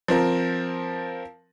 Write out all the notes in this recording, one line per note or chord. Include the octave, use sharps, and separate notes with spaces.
F3 C4 A#4